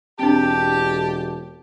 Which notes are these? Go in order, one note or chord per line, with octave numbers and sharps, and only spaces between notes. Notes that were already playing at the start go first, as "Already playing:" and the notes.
E1 C4 D4 G4 A5